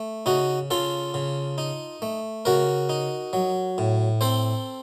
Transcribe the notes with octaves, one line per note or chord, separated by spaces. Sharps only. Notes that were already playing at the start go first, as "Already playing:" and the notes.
Already playing: A3
C#3 D#4 F#4
C#3 F4 A4
C#3
D#4
A3
C#3 F#4 A#4
D#4
F#3
A2
C4 A4 C5